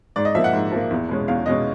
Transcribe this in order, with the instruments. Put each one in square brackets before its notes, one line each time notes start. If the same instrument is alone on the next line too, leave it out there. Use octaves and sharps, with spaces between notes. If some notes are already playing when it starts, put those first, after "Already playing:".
[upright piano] G#2 D5
D#5
F3 A#3 E5
F#5
G#2
F3 A#3
E2
B2 G#3 C#4
E2 F5
B2 G#3 C#4 D#5